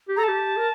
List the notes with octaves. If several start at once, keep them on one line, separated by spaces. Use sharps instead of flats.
G4
A4 A#5
G4 A5
A#4